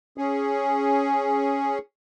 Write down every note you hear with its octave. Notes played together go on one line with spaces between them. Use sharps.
C#4 G#4